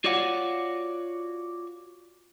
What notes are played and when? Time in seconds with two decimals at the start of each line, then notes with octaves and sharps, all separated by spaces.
0.04 F4 F#4 C#5 D5 F5 F#5